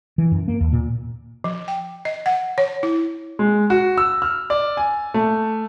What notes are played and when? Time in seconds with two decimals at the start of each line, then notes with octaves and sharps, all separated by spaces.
0.18 E3
0.32 F#2
0.48 A#3
0.61 D#2
0.73 A#2
1.44 F3
1.68 G5
2.05 D#5
2.26 F#5
2.58 C#5
2.83 E4
3.39 G#3
3.70 F#4
3.98 E6
4.22 F6
4.50 D5
4.77 G#5
5.14 A3